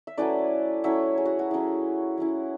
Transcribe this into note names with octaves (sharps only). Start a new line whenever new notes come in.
E5
F#3 A3 C#4 E4 B4 D5
F#3 A3 C#4 E4 C#5 E5
G#4
F#4
F#4
F#3 C#4 E4 G#4
F#3 C#4 E4